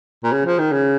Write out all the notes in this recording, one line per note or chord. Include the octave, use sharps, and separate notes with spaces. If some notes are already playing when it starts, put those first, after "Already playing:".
A#2
C#3
F3
D#3
C#3